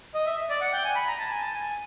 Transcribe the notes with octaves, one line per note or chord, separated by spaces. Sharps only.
D#5
E5
D5
F#5
G5
G#5
B5
A#5
A5
G#5
A5
G#5